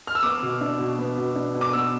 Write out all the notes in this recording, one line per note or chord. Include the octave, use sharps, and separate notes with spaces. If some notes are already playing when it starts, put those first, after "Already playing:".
F6
E6
B3 D6
B2
D4
B2
B3
B2
D4
B2
D6
B3 E6